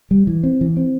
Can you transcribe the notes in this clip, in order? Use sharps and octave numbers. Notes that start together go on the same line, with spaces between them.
G3
E3
C4
E3
C4